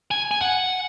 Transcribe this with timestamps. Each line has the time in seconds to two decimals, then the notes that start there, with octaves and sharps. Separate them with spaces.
0.11 G#5
0.31 G#5
0.42 F#5